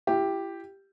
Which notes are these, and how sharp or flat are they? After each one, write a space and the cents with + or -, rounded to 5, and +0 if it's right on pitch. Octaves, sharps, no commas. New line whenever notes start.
E4 +35 G4 +0